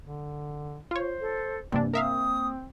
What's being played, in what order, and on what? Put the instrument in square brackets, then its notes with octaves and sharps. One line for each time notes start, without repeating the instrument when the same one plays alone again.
[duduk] D3
[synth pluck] F4 C#5 [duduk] C5
[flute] A4
[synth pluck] G2 C3 D4 [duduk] E3 [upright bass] A#3 [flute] D5
[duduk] C4 [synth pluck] A#4 E5 F5 [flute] D#6